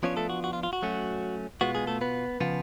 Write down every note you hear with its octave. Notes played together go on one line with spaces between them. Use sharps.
F3 B3 C#4 D4 F4 C#5
A3 A4
F#4
F#4
F4
F4
F#4
F#3 A3 C#4
B2 G#3 B3 F4 F#4
G#3 G#4
A3 A4
B3 B4
C#3 F3 B3 F4